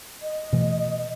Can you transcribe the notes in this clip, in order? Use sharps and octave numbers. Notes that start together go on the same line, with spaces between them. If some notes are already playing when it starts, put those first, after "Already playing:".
D#5
B2 E3 A3